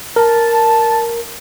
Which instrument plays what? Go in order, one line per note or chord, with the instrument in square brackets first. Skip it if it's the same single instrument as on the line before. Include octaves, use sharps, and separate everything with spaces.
[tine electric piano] A#4 [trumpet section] A5